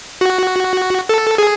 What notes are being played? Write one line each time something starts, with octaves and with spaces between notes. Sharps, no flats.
F#4
A4
G#4